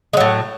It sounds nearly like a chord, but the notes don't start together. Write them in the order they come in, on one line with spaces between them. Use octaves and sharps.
G#3 F#3 A2